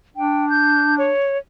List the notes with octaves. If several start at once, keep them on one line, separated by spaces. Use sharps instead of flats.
D4 G5
G6
C#5